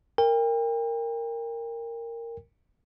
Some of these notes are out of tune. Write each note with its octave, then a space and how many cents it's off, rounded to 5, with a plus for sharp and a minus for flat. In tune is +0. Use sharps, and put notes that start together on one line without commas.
A#4 -10 G5 +35